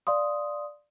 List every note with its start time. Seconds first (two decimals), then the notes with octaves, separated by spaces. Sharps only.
0.07 D5 F5 C6 D#6